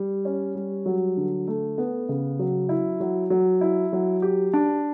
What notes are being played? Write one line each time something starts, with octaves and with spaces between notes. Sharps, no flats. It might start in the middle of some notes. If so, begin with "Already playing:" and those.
Already playing: G3
C#4
G3
F#3
D3
A3
B3
C#3
F#3
E4
F#3
F#3
E4
F#3
G4
D4